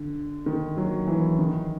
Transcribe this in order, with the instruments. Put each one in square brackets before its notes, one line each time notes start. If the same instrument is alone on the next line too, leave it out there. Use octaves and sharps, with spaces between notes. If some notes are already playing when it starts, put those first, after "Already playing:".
Already playing: [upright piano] D3
D#3
F#3
E3
D#3